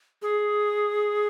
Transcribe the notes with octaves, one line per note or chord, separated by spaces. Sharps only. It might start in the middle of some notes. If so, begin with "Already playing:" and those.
G#4